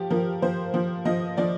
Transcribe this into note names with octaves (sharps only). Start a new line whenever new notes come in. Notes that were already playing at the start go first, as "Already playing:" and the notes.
Already playing: F3 G4
F3 A#4
F3 C5
F3
F3 D#5
F3 D5